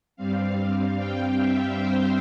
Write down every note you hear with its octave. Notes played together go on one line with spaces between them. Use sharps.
G2 G3 C4 F5
G5
E5
C5